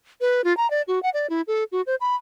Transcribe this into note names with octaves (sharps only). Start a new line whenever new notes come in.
B4
F4
A#5
D5
F#4
F#5
D5
E4
A4
F#4
C5
B5